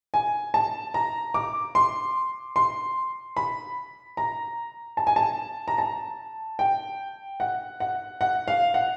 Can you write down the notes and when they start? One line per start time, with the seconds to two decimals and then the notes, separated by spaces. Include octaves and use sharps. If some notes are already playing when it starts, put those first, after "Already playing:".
0.14 G#5
0.54 A5
0.94 A#5
1.34 D6
1.75 C6
2.56 C6
3.37 B5
4.17 A#5
4.97 A5
5.07 G#5
5.16 A5
5.68 A#5
5.78 A5
6.59 G5
7.40 F#5
7.80 F#5
8.21 F#5
8.48 F5
8.74 F#5